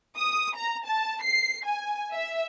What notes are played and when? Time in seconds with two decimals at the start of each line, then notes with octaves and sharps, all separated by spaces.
0.17 D#6
0.56 A#5
0.85 A5
1.23 C7
1.65 G#5
2.12 E5